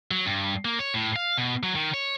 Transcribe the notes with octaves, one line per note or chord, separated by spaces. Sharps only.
F#3
G2
A#3
C#5
A2
F5
B2
F#3
D#3
C#5